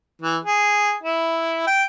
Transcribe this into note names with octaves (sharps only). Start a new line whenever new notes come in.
E3
G#4
E4
G5